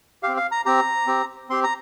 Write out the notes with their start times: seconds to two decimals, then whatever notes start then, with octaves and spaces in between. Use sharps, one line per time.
0.23 C4 G4 F5
0.37 F5
0.52 A#5
0.66 C4 G4 A#5
1.07 C4 G4
1.50 C4 G4 C6
1.64 A#5